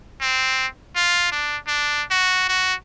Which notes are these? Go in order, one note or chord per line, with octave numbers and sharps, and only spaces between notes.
C4
F4
D4
D4
F#4
F#4